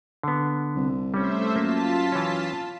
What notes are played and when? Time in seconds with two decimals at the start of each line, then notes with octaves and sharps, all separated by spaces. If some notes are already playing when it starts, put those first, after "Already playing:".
0.23 D3 B3
0.76 C2
1.14 G3 A3 C#4 C5 E5
1.56 F#2 A#3 F4 A5 B6
2.12 E3 C#4